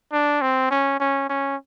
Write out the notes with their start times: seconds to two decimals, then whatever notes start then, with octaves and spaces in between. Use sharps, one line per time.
0.13 D4
0.42 C4
0.71 C#4
1.00 C#4
1.30 C#4